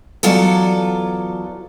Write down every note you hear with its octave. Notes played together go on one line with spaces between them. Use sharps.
E2 F#3 F4 A4 D5